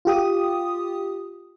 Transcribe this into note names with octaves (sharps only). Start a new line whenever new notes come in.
F4 G4 D#6